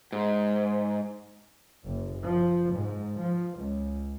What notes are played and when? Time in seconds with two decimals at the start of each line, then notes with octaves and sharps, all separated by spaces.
0.12 G#2
1.84 F#1
2.25 F3
2.73 G#2
3.17 F3
3.56 C#2